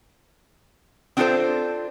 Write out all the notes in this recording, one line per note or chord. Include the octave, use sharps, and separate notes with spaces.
C4 D4 F4 F#4 A4 C5